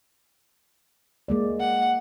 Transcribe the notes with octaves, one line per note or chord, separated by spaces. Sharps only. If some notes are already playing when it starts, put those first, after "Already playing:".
G#3 A#3 D5
F#5